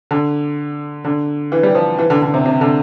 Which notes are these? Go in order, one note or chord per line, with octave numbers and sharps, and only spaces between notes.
D3
D3
E3
G3
F3
E3
D3
D3
C3
C3
D3